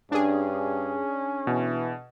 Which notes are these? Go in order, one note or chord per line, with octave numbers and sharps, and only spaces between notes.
G2 C#4 D4 G#4
B2 E3